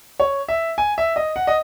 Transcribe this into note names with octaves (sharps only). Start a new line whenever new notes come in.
C#5
E5
G#5
E5
D#5
F#5
D#5